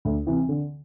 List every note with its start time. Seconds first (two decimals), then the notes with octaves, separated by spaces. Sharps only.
0.05 D2
0.27 C3 E3
0.49 D3